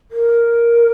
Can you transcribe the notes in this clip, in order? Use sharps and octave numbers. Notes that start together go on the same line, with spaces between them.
A#4